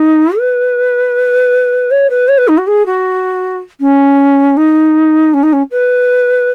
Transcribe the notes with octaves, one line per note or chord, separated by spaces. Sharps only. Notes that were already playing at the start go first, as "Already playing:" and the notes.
Already playing: D#4
B4
C#5
B4
C#5
B4
D#4
F#4
G#4
F#4
C#4
D#4
C#4
D#4
C#4
B4